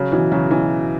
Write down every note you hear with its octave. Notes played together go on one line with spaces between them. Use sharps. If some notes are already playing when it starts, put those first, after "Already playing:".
Already playing: C#3 F#3
B2 E3
C#3 F#3
B2 E3